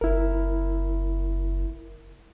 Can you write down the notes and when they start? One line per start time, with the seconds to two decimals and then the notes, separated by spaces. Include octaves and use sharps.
0.01 F#1 E4 A#4